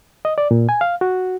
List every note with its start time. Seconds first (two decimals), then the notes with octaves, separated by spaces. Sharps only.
0.25 D#5
0.38 D5
0.51 A#2
0.69 G#5
0.81 F5
1.01 F#4